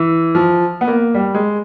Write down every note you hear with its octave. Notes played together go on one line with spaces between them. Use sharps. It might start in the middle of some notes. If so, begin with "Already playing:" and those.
Already playing: E3
F3
B3
A#3
G3
G#3